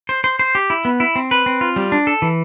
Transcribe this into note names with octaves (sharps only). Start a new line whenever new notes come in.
C5
C5
C5
G4
E4
B3
E4
C4
B4
C4
F4
G3
D4
A4
E3